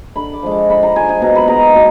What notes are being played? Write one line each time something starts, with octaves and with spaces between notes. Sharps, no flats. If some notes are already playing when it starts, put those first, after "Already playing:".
D3 B5
D6
F3 G#3
D6
D3 B5
A#5
F3 G#3 G#5
G#5
B2 A#5
B5
G#3 B3 D#4 A#5
B2